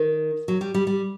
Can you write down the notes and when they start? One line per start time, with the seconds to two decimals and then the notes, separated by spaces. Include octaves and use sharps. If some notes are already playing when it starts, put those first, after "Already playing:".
Already playing: D#3
0.48 F#3
0.61 G3
0.74 G3
0.87 G3